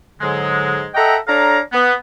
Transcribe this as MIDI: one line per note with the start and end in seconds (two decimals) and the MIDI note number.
0.20 0.86 44
0.20 0.86 50
0.20 0.86 54
0.20 0.86 56
0.94 1.16 69
0.94 1.16 75
0.94 1.16 76
0.94 1.16 78
0.94 1.16 79
0.94 1.16 82
1.27 1.59 62
1.27 1.59 69
1.27 1.59 73
1.27 1.59 77
1.27 1.59 82
1.72 1.93 59